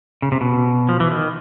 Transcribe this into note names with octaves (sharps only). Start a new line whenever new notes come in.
C#3
C3
B2
F3
E3
D#3